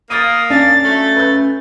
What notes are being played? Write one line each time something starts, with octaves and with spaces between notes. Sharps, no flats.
A#3 D#6 A6 D#7
C#4 D4 F5 A6
F#3 A3
B4 G6